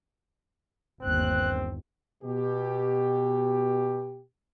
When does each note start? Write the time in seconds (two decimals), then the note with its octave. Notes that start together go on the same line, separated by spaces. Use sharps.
1.02 G1 D#2 C4 F#6
2.23 B2 G4